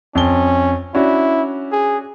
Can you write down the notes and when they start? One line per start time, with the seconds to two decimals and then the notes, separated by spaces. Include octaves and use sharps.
0.15 F2 C#4 G7
0.95 C#4 D4 E4 F#4
1.72 G#4